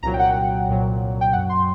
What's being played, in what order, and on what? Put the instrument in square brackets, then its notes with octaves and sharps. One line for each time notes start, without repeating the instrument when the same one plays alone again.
[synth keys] C2 A#2 F#3 A#5
G5
F#5
C2 A#2 F#3
G5
F#2 F#3 F#5
C6